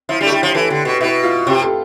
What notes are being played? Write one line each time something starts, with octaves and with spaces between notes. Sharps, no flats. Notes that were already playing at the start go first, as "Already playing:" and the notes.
F3 E4
G3 D4
A3
G3 E4
F3 G4
E3 A4
D3 G4
B2
B2 E4
F4
C3 G4
A4